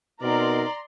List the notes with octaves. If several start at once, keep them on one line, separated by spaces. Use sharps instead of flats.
B2 C4 D#4 A#4 D5 A#5 C6